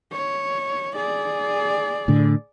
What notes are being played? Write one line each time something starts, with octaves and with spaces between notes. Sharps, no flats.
C#5
G#4 D5
A2 D3